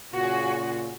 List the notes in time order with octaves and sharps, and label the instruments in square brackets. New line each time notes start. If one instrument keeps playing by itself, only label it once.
[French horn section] A#2 C#3 F4 [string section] F#4 G#4